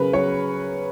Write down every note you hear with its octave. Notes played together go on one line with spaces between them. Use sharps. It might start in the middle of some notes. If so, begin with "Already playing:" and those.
Already playing: C#3 F#3 A#4 B4
F#3 C#5